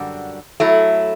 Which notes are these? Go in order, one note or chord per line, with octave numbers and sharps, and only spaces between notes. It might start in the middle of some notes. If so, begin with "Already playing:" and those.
Already playing: F#2 D3 G3 D4 F#4
F#3 A3 E4